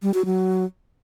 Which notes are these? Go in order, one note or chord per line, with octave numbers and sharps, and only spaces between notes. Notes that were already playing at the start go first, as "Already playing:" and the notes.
G3
F#4
F#3